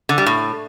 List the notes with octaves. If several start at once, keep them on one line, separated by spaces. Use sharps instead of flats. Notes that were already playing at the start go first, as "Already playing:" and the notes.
D3
G3
A2